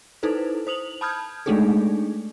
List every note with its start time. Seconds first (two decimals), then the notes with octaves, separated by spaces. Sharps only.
0.23 D#4 E4 A4 B4 C5
0.67 C5 D#6 F7 F#7
1.01 A5 B5 D#6 F6 G6 G#6
1.46 G#3 A3 D4 D#4 G#4 A4